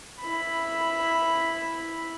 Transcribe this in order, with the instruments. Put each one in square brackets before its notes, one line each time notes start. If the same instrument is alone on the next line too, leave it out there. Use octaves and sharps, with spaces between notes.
[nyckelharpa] E4 B5